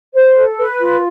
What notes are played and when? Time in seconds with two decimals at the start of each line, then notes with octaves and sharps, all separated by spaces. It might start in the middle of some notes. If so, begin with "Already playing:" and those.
0.14 C5
0.35 A4
0.58 B4
0.79 F4